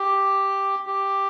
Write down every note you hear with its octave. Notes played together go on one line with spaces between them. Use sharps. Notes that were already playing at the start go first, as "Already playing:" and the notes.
Already playing: G4
G4